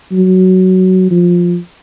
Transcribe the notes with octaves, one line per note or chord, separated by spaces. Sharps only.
F#3
F3